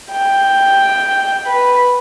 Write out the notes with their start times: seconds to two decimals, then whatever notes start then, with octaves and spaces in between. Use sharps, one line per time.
0.11 G5
1.46 B4